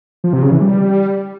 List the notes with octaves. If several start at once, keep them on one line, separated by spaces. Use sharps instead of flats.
F3
C3
C#3
E3
G3